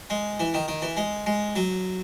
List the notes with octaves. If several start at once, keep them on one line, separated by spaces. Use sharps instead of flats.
G#3
E3
D#3
D#3
E3
G#3
G#3
F#3